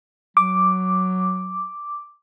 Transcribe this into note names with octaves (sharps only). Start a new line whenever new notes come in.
F#3 D6